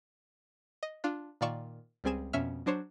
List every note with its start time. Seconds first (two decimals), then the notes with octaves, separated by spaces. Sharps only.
0.83 D#5
1.04 D4 F4
1.41 A#2 D#3 F4 D5 C#6 E7
2.04 C#2 G3 C4 G#4 G#5 E7
2.33 F2 B2 C#4 E5 F6
2.66 F#3 D4 C5 C#5